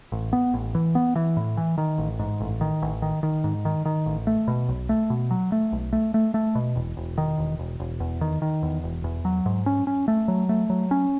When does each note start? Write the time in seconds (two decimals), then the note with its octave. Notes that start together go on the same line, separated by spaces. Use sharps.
0.12 A1
0.33 B3
0.54 A1
0.75 E3
0.95 B3
1.16 E3
1.37 A2
1.57 E3
1.78 D#3
1.98 A1
2.19 G#2
2.40 A1
2.61 D#3
2.82 A1
3.02 D#3
3.23 D#3
3.44 G#2
3.65 D#3
3.85 D#3
4.06 A1
4.27 A3
4.48 B2
4.69 B1
4.89 A3
5.10 B2
5.31 F#3
5.52 A3
5.72 B1
5.93 A3
6.14 A3
6.34 A3
6.55 B2
6.76 E1
6.97 E1
7.18 D#3
7.38 E1
7.59 E1
7.80 E1
8.00 E2
8.21 D#3
8.42 D#3
8.63 E2
8.84 E1
9.04 E2
9.25 F#3
9.46 G#2
9.66 C#4
9.87 C#4
10.08 A3
10.28 F#3
10.49 A3
10.70 F#3
10.91 C#4